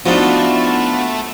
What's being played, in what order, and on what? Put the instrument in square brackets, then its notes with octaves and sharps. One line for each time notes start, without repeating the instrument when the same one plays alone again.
[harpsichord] F3 D#4 [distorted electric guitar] A3 [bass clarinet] B3 [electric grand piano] D4 F4 F#4